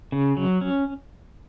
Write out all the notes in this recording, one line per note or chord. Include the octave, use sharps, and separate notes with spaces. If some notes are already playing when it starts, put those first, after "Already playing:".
C#3
F#3
C#4